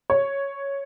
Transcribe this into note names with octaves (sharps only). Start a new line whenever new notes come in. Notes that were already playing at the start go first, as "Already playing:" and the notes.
C#5